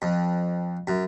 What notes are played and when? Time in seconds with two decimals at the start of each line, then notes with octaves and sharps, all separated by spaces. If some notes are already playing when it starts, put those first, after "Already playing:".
0.02 F2
0.87 F#2